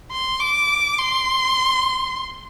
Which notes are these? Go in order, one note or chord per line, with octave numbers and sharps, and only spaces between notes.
C6
D6
C6